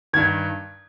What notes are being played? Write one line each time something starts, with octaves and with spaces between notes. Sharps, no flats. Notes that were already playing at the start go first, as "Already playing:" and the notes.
G2 D#3 G#6